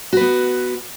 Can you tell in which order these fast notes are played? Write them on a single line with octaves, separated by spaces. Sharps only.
F#4 B4 B3